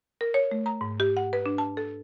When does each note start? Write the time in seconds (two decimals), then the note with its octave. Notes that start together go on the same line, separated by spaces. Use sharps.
0.21 A#4
0.34 C#5
0.51 A3
0.66 A#5
0.81 G#2
1.00 G4
1.17 F#5
1.33 B4
1.46 D4
1.58 A5
1.77 A4